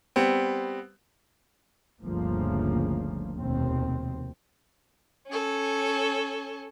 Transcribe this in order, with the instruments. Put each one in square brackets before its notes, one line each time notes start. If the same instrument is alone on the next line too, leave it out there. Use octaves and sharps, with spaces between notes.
[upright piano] G3 B3 C4
[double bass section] G1 D2 C#3 F3 A3 A#3
F1 D#2 B2 C4
[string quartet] C#4 A4